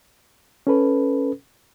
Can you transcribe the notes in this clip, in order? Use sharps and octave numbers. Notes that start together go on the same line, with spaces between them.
C#4 A4 B4